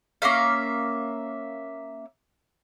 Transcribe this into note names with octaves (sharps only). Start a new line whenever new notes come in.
A#3 C#4 E5 F5